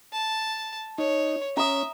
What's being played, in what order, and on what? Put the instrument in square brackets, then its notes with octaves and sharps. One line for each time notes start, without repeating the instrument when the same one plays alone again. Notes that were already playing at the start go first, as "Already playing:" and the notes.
[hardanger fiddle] A5
[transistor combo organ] D#4 [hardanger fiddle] C#5
[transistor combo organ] C#4 [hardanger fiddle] E5 [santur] A#5 D#6